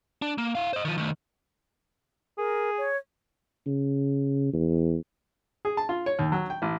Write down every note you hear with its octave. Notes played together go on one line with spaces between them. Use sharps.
D4
A#3
E4 F5
C5 D#5
D#3 F3
D#3 A3
G#4 A#4
C#5
C#3
E2
G#4
A5
F4
C#5
D#2
F#3
G5
A1